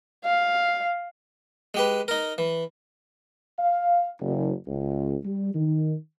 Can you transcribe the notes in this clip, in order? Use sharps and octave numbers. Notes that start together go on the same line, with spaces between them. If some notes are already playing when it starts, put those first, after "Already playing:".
F5
G#3 G4 B4
D#4 A#4
E3
F5
F#1
C#2
G3
D#3